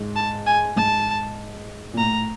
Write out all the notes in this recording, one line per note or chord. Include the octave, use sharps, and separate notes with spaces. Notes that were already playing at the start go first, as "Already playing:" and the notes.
Already playing: G#2
A5
G#5
G#2 A5
A#2
A2 A#5